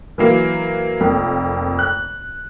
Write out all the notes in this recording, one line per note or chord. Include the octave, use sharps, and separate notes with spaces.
E3 F#3 A#3
F1 F2 A#3
F#6